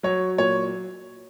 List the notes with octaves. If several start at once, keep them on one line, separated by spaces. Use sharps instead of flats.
F#3 C#5
A#2 C#5